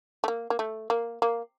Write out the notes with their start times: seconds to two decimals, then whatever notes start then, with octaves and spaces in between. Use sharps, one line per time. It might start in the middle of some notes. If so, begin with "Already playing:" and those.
0.24 A3
0.28 A#3
0.50 A#3
0.59 A3
0.90 A#3
1.22 A#3